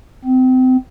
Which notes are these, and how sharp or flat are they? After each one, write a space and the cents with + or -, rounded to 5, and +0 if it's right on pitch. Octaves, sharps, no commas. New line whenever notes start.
C4 -30